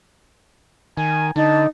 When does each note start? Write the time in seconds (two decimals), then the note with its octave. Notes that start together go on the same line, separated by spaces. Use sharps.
0.97 D#3 G#5
1.36 D3 D#4 A5